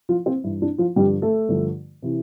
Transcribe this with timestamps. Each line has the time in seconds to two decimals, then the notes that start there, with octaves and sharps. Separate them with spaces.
0.09 F3 F4
0.26 C4 C5
0.44 G2 E3 E4
0.62 D4
0.78 F3 F4
0.96 G2 D3 F3 G3 G4
1.22 A3 A4
1.49 G2 D3 F3
2.02 C3 E3